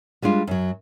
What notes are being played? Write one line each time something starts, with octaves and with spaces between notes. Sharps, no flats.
G3 G#3 D4 F4
F#2 F#3